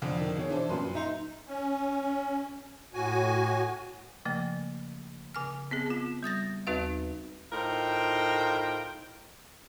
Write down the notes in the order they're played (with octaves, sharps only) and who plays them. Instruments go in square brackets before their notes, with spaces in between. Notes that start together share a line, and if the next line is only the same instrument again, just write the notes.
[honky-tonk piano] F2 D3
[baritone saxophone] D#3
[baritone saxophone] B2 [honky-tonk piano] G#4 C#5
[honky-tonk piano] E3 C5 A5 [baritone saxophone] D4
[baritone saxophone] F#2 [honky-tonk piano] A#2 B4 C6
[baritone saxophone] D#4 [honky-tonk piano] E5 A#5 C6
[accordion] C#4
A2 F#4 G#5
[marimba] C#3 F3 A3 A#3
C#3 G#5 F6
B3 C4 G#4
B3 F4
G3 D#6 A6 A#6
D#2 C4 D#4 F#4 B4 F5
[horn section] A2 D#4 F4 A#4 C5 G5